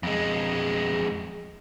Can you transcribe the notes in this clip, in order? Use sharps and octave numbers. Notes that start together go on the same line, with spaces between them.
F2 G#3